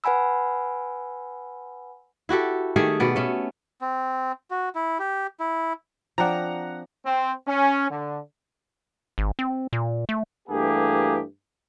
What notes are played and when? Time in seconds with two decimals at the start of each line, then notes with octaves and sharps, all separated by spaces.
0.04 B4 F#5 G#5 B5 E6
2.29 E4 F#4 G4 A4
2.76 D#3 A3 G4 G#4
3.00 B2 B3 D5
3.16 A3 C#4
3.81 C4
4.51 F#4
4.75 E4
4.99 G4
5.40 E4
6.18 F3 C4 D4 F#5 A#5
7.06 C4
7.47 C#4
7.90 D3
9.18 G#1
9.39 C4
9.73 A#2
10.09 A3
10.48 G2 E3 A3 A#3 G4 G#4